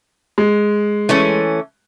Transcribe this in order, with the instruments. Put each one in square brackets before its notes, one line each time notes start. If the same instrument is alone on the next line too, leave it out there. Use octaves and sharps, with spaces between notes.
[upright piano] G#3
[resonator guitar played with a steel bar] E3 A3 C#4